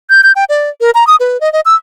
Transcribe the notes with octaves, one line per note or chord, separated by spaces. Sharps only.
G6
G6
G5
D5
A#4
A#5
D#6
B4
D#5
D#5
E6